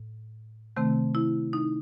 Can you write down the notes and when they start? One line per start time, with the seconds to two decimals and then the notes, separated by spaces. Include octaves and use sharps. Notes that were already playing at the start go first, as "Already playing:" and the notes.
Already playing: A2
0.76 C3 D#3 A3 C4
1.15 E4
1.53 D#4